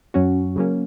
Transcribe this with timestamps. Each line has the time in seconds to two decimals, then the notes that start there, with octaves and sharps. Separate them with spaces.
0.14 F#2 F#3 C#4 F#4
0.56 C#3 F#3 A#3 C#4